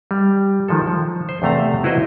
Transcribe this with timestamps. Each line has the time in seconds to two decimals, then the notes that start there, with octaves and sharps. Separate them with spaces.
0.11 G3
0.68 D#3 F3 G#3 A4
0.87 F3
1.29 C5
1.42 E2 C3 A3 F5 A#5
1.84 E4 F#4 B4 C5 D#5